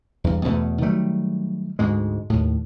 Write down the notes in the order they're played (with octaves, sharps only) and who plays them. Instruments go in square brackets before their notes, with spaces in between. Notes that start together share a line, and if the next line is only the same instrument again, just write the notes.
[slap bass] E2 G2
E2 B2 A3
D#3 F#3 G3 A3
D2 G#2 G#3
D#2 A2